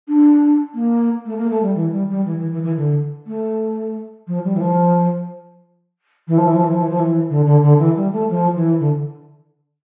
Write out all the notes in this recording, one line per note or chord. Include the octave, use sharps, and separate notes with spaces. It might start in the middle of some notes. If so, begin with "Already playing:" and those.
D4
A#3
A3
A#3
A3
G3
E3
G3
G3
E3
E3
E3
E3
D3
A3
F3
G3
E3
F3
E3
F3
E3
F3
E3
F3
E3
F3
E3
D3
D3
D3
E3
G3
A3
F3
E3
D3